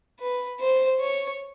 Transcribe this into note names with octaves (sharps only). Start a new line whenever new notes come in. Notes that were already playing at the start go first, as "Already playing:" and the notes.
B4
C5
C#5